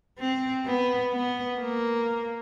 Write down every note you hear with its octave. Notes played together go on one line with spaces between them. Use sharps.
C4
B3
B3
A#3